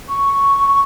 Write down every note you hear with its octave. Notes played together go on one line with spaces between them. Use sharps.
C#6